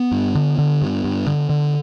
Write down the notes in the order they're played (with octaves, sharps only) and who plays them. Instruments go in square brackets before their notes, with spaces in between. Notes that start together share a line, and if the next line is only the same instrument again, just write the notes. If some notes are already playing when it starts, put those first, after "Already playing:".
Already playing: [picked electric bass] B3
G2
D3
D3
G2
G2
D3
D3